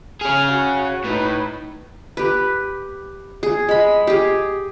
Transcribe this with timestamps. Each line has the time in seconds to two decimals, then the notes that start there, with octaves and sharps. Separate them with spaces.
0.21 C#4 G#4 F6
0.51 F#4
1.04 A2 D#4 B4
2.17 G4 B4
3.43 G#4
3.69 G#3 B5
4.07 G4 G#4